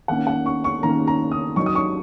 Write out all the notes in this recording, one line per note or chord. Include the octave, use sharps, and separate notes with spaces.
D#3 A#3 C#4 F#5
F#5
C#6
C#6
D#3 A#3 C#4 A#5
A#5
D#6
F#3 D#4 C#6
D#6
C#6